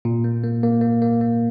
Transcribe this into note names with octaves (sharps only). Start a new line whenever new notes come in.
A#2
A#3
A#3
A#3
A#3
A#3
A#3